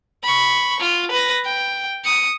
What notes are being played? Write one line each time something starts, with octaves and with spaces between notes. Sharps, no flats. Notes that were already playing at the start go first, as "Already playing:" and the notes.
B5 C#6
F4
B4 A#6
G5
D#6 C#7